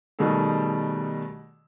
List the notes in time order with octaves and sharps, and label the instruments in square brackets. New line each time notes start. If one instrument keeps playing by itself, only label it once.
[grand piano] B2 D#3 G3 A3 G#4 A4